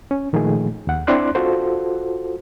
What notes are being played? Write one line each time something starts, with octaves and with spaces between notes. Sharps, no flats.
C#4
A#2 D#3 F3 A3 G#4
D#2 F#5
C4 D4 E4 D5 C6 F#6
F4 F#4 A4 C5